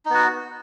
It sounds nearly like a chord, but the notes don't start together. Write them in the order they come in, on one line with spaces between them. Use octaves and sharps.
D#4 B3 F#4